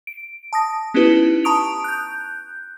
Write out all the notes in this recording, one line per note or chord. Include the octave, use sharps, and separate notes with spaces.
D7
A5 D#6 A#6
B3 C#4 D#4 E4 G4 B4
A5 A#5 C#6 D#6 D7 F7
F#6 G6